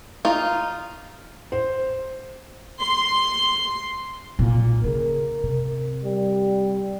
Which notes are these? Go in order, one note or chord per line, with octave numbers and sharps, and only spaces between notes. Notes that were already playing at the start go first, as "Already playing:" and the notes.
D#4 F4
C5
C6
B1 A#2
C#3 A#4
C3
G3